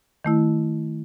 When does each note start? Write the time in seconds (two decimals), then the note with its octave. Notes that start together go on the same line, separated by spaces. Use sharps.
0.25 D#3 A3 E4